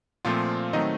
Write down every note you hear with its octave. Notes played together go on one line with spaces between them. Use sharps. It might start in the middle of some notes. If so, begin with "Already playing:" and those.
A#2 F3 A3 C4 F4 F5
D#3 F#3 A3 C4 D#4 D#5